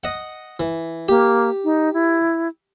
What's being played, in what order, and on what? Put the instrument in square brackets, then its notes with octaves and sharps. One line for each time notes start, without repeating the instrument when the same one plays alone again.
[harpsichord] D#5 F#5
E3
[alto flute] A#3 [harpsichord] G4
[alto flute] D#4
E4